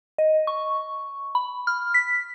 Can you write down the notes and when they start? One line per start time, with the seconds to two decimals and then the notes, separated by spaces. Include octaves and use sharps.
0.18 D#5
0.47 C#6
1.35 B5
1.67 F6
1.94 B6